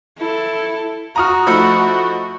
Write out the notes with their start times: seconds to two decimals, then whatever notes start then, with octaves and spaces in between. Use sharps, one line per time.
0.18 E4 A4
1.16 F#4 A#5 D#6 F6
1.47 F3 A3 D#4 B5 E6 C#7